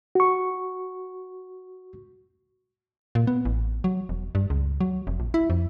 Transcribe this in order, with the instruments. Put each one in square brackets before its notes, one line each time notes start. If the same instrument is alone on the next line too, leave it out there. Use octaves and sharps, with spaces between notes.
[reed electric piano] F#4 C#6
[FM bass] A#2
B3
A1
F#3
E1
G2
C#2
F#3
F1
A#1
E4
F2